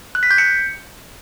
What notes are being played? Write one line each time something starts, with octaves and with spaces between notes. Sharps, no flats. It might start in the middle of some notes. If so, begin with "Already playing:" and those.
F#6
B6
G6
C#7